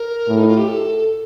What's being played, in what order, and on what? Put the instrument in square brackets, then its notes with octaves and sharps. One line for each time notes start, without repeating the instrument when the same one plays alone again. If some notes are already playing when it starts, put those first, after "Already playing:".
Already playing: [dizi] A#4
[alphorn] A2
[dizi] D#4
F4
G4
A4